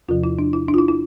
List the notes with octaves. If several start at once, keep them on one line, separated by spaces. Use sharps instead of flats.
E2 C3 F3 F4
E4
D4
E4
D4
F4
E4
E4